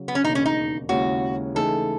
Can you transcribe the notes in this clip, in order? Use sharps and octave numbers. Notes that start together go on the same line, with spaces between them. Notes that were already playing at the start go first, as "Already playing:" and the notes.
Already playing: C#3 F#3
B3
C#4
E1 D#2 C#3 D#4
C#4
D#4
D#2 C#3 G#3 C#4 E4 F#4
C#3 E3 A3 D#4 G#4 A4